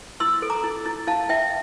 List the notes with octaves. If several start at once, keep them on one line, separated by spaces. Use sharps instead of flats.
E4 C6 E6
A4
A#5 D6
E4
E4
E4 F5 A5
E4 E5 G5